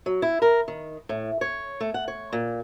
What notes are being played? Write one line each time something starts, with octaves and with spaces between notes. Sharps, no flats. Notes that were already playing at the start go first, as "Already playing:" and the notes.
F#3
E4
A#4
D#3
A2
C#5
A3
F#5
C#5
A#2